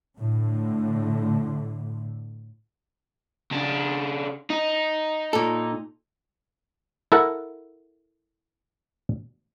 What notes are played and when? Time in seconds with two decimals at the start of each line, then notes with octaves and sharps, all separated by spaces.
0.16 A2 D3
3.51 C#3 D4
4.50 D#4
5.33 A#2 A4
7.12 E4 A4 A#4 F#5